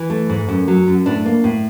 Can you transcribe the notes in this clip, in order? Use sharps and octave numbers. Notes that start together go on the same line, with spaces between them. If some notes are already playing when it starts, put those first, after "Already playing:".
Already playing: E3
A3
G#2
F#2
F#3
F#2
A2 D4
A#3
A2